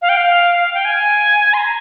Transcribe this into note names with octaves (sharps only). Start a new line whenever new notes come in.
F5
G5
F5
F5
G5
G#5
C6
A#5